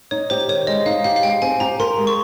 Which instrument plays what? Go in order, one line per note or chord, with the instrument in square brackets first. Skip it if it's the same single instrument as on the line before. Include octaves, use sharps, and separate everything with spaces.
[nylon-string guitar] D#4 [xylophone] C#5
[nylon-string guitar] G4 [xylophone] C5
[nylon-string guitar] D#3 [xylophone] C#5
[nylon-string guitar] G#3 [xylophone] D#5
[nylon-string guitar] D#4 [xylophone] F5
[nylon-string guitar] G4 [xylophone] F5
[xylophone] F5
[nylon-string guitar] G#3 [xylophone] G5
[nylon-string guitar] C4 [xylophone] G#5
[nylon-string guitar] G4 [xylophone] A#5
[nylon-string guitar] A#4 [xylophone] C6
[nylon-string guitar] G#3
[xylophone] C#6